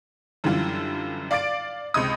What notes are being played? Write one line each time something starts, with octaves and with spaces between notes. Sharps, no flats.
F#2 D3 E3 G3 F4
D5 F5 D6 A6 D7
C#2 C3 D#5 D#6